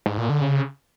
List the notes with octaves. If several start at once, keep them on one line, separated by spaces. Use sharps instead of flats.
G#2
A#2
D3
C#3